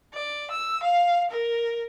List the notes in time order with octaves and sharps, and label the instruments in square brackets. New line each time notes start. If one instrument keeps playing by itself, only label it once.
[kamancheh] D5
E6
F5
A#4